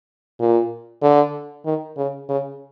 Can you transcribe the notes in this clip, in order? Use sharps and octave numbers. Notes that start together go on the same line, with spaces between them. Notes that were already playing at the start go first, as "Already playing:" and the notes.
A#2
D3
D#3
C#3
C#3